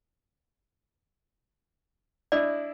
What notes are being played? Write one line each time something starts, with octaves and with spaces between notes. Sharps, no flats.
D4 E4 D5 D#5